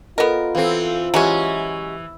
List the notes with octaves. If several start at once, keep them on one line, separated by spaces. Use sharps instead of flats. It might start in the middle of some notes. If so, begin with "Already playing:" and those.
B3 F4 A4 A#4 D#5
E3 C4 A4 F5
E3 F#3 G#3 C#4 G4 E5